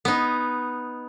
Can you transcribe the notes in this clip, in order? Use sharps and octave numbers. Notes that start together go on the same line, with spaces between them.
B3 D#4